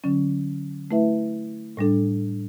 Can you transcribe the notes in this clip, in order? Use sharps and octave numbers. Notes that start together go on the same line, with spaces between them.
D3 F#3 C#4
A3 E4 B4 E5
A2 G3 D4 A4